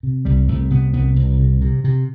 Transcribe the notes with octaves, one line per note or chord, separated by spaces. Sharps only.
C3
C2 G3
C2 A3
C3 B3
C2 B3
C2
C3
C3
C3